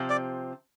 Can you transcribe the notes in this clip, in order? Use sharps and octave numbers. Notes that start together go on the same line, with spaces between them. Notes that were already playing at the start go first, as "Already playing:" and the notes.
Already playing: C3 F3 C4 G4
D5